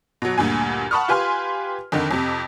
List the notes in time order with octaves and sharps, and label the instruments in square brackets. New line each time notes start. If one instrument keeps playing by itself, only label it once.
[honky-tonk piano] B2 F#3
D2 G2 A#2 G#5
F#5 A5 B5 C#6 D#6 F6
F4 G4 B4 G#5 C6 F6
F2 D3 D#3
F2 C3